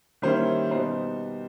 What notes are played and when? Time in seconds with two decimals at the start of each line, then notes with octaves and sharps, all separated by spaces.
0.22 D#3 G3 A#3 C#4 E4 C5
0.71 B2 G3 B3 D#4 C5